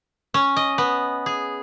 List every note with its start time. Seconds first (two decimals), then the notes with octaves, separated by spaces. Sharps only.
0.34 C#4
0.56 D#5
0.78 B3
1.26 G#4